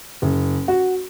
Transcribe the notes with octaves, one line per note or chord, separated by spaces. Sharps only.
F#1
F#4